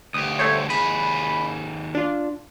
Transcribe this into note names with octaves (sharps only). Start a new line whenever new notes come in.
D2 G4 D#6
A3 C5 C#5
D#2 G#4 B5
D4 F4